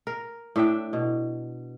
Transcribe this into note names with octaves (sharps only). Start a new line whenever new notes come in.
A#4
A2 D4 E5 G5
B2